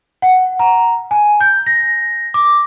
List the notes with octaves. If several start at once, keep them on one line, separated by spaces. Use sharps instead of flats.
F#5
A#5
G#5
G6
A#6
D6